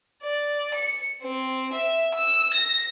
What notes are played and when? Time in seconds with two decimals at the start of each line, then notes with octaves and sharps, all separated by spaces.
0.23 D5
0.74 C#7
1.23 C4
1.73 E5
2.15 E6
2.54 A#6